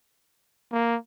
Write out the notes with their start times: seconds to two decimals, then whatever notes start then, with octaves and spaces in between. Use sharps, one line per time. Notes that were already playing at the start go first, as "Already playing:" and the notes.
0.72 A#3